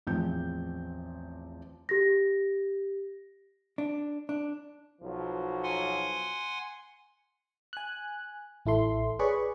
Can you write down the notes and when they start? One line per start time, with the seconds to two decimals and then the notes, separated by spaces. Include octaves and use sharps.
0.07 A1 E2 F3 C4 G6
1.89 G4 A#6
3.78 D4
4.29 D4
5.02 B1 F3 F#3
5.63 F#5 G#5 C6
7.73 G#5 F#6
8.66 A1 E4 A4 C6
9.19 G#4 B4 C#5 D5 B5 C#6